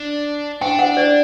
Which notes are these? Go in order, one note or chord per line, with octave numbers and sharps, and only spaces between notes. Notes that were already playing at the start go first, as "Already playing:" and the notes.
Already playing: D4
D4 G5
F#5
D5